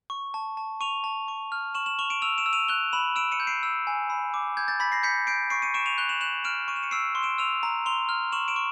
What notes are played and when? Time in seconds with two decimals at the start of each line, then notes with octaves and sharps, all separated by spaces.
0.10 C#6
0.34 A5
0.57 A5
0.81 C#6 D#7 F7
1.04 A5
1.28 C#6
1.52 F6
1.75 C#6 E7 F#7
1.86 E7 F#7
1.99 C#6 F7 G7
2.10 D7 E7
2.22 E6 D#7 F7
2.38 D7 E7
2.46 E6
2.53 D#7 F7
2.68 F#6 F7 G7
2.93 B5 E7 F#7
3.16 E6 D7 E7
3.32 C#7 D#7
3.40 G6
3.47 C7 D7
3.63 E6
3.87 G#5
4.10 B5
4.34 D6
4.57 G6 G#6
4.68 G6 A6
4.80 B5 A6 B6
4.92 A#6 C7
5.03 G6 B6 C#7
5.27 G6 C7 D7
5.50 C#6 C7 D7
5.62 C#7 D#7
5.74 C#6 D7 E7
5.86 D#7 F7
5.98 F#6 F7 G7
6.09 E7 F#7
6.21 F#6 E7 F#7
6.44 F6 D7 E7
6.68 C#6 D#7
6.76 E7
6.83 C#7 D#7
6.91 E6 C7 D7
7.15 C6
7.23 D7 E7
7.38 E6 D#7 F7
7.63 A#5
7.86 C6 F7 G7
8.09 F6
8.32 C#6 E7 F#7
8.48 D7 E7
8.56 C#6